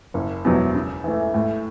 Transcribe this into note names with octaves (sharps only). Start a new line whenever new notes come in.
F#1
E2 B2 F#3
C#3
E3 A3
A2